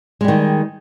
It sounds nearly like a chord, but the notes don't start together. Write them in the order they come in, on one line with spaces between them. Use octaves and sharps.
G#3 G3 D#3